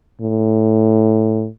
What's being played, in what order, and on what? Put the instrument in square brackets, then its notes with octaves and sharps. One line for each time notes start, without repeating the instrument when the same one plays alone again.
[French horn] A2